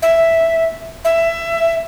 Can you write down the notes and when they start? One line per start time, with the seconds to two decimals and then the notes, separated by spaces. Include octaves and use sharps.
0.02 E5
1.05 E5